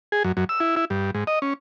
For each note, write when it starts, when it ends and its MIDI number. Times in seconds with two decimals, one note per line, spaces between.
0.12 0.23 68
0.24 0.32 42
0.37 0.44 42
0.49 0.60 88
0.60 0.75 64
0.76 0.85 64
0.90 1.11 43
1.14 1.24 44
1.27 1.39 75
1.42 1.54 61